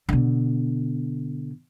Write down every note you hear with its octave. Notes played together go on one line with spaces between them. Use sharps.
B2 D3